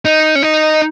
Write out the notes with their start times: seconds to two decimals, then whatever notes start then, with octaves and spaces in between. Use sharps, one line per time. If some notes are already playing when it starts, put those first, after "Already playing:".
0.05 D#4
0.35 C#4
0.42 D#4